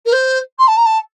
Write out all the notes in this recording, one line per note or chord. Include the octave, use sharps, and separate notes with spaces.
A#4
C5
C6
A5
A#5
A5